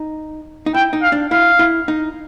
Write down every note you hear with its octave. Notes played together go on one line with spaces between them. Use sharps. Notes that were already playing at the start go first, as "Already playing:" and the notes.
Already playing: D#4
D#4
E4 G5
D#4
F5
D4
E4 F5
E4
D#4